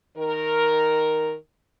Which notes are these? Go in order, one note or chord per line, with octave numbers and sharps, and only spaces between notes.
D#3 A#4